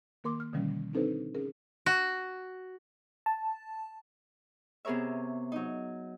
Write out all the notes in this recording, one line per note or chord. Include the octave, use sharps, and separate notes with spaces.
D#3 A#3 A#4 C6 D6
F6
B2 D3 D#3 F3 G3 C#4
C4 D4 D#4 A4 B4 C5
C#4 G#4 A#4
F#4
A5
C3 B3 G#4 A#4 C#5 E5
F#3 D#4